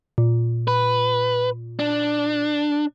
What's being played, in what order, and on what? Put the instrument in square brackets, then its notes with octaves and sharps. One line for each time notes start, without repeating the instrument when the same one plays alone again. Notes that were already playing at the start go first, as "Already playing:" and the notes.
[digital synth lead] A#2
[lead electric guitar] B4
D4